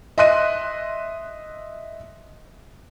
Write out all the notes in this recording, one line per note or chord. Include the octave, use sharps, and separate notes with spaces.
D#5 E5 C6 F#6 D#7